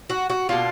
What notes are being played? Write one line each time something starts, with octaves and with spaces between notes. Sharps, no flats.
F#4
F#4
B2 A#3 D4 F4